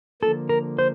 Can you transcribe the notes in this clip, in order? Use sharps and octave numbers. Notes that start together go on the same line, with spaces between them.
D3 F3 A#3 A4
A#4
C5